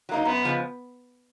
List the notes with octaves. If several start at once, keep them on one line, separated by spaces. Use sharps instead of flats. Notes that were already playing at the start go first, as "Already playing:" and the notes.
F#3 A#3 D#4
F#2 B3
C#3 F3 G#3